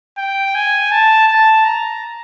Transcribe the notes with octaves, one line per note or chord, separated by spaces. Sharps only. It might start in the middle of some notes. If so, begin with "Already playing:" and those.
G5
G#5
A5
A5
A#5